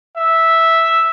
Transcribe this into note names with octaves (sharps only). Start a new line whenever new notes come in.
E5